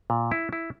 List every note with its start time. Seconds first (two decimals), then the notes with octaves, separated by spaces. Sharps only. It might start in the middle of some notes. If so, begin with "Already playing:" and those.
0.10 A#2
0.31 E4
0.53 E4